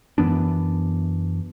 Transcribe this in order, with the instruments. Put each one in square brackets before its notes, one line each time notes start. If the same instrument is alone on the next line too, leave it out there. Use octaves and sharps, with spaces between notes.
[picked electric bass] F#2 E3 B3 D4